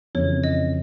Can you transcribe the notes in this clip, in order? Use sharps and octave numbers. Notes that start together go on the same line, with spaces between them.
F2 C#3 E3 C#5
D#5